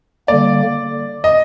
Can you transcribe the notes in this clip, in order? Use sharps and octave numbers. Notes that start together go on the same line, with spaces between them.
D3 G3 A#3 D5
D#5